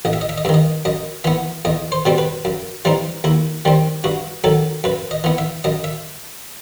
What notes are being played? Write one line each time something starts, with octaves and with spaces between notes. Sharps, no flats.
A1 D#5
E5
D#5
E5
D#5
G2 D#3 D#5 E5
F#2 D#5
E3 B3 E5
E2 D#5
C5
B2 G3 C4
B4
F#2
E3 G3 C4 D#4
D#2 E4
D#3 G3 C4
G2 F#4
D#3 F#3 A4
F#2 B4
D#5
E3 B3
E5
F#2 D#5
E5